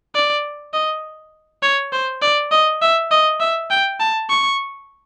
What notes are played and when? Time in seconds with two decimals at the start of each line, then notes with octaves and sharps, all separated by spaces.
0.15 D5
0.73 D#5
1.63 C#5
1.93 C5
2.22 D5
2.51 D#5
2.82 E5
3.11 D#5
3.40 E5
3.70 G5
4.00 A5
4.30 C#6